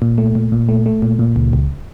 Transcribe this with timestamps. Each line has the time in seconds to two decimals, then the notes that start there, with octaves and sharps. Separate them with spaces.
0.02 A#2
0.18 A3
0.35 A#2
0.52 A#2
0.69 A3
0.86 A3
1.02 A#2
1.19 A#2
1.36 C#2
1.53 C#2